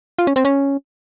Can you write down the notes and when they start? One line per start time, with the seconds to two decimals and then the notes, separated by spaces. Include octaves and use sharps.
0.19 F4
0.27 C#4
0.36 C4
0.45 C#4